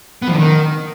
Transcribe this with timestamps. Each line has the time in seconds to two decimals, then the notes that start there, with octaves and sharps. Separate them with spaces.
0.22 B3
0.28 F3
0.33 D3
0.38 D#3